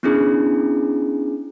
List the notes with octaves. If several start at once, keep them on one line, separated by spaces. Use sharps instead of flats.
B3 C#4 D4 E4 G#4